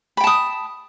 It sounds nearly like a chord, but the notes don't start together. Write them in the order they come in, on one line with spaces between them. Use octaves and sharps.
B5 G5 A5 D#6